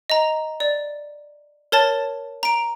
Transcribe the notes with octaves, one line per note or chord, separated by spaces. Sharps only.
D#5 A#5
D5
A#4 C#5 A5 A6
A#5 D7